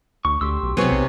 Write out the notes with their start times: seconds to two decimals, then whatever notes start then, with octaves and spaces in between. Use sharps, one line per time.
0.25 D2 C#6
0.41 D2 G4 C6 E6
0.63 B1
0.77 C3 F#3 B3 C4 G#4 C#5
0.92 B1